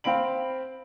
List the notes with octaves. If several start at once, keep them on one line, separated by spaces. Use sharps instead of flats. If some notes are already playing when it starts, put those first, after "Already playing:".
C4 F5 B5 D7 F#7